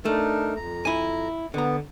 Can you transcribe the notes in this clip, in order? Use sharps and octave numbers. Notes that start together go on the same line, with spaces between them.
A3 D4 D#4 A#4
F2 A#5
E4 G#5
D3 B3 A#5